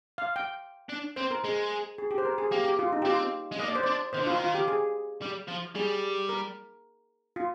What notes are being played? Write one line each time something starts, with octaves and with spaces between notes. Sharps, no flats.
F5
G5
D4
C4 C5
A#4
G#3 G#4
G#4
G4
C5
A#4
G#4
A#3 G4
G4
F4
D#4
G4
C4 F4
G#3
A#3 D#5
D5
C5
D4 D5
D#3 C5
D3
D#3 F4
F4
G4
G#4
G3
F3
G3 G#4
A#4
F4